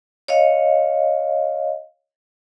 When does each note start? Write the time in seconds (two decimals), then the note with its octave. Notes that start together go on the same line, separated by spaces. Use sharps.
0.28 C#5 D#5 F5